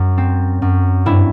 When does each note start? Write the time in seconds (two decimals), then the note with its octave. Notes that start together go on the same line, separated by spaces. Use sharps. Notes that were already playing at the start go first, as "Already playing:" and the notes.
Already playing: F#2
0.18 C4
0.62 F#2
1.06 G2 E4